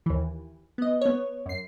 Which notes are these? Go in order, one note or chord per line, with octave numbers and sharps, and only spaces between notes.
D#2 E3
B3 D#5
B3 C#5
F#2 C7